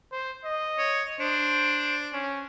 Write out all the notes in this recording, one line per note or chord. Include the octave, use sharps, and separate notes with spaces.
C5
D#5
C#5
D4 C5
C#4